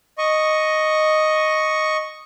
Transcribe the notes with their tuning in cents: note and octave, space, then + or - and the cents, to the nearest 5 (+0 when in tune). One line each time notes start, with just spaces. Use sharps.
D#5 +0 C#6 +0